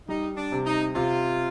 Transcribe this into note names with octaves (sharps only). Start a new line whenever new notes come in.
G3 D#4
D4
C3
D#4
C3 F4